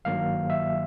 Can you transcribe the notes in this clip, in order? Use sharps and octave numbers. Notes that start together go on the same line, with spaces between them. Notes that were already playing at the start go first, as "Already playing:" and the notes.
G#1 G2 D#3 F#3 A#3 F5
E5